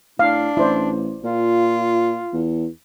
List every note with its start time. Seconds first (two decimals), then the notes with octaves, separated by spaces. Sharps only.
0.19 A2 D4 F5
0.57 A1 E4 C5 D5
1.24 A#2 F4
2.33 E2